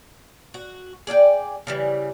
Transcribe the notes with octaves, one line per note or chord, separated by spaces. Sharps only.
F#4
G#4 D5 F5 G5
C#3 E3 G3